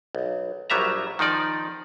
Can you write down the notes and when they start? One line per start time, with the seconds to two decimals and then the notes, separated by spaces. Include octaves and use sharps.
0.15 B1
0.70 A#1 F#3 G3 E5 A#5
1.19 D#3 F3 D#4 D5